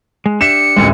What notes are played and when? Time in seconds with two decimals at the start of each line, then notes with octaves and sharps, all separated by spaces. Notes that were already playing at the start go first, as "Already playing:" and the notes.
0.26 G#3
0.41 D4 G4 E5 C#7 E7
0.76 A1 D2 G#3